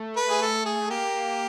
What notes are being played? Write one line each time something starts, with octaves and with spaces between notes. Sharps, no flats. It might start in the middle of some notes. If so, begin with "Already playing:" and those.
Already playing: A3
B4
G#4
A4
G#4
A#3 G4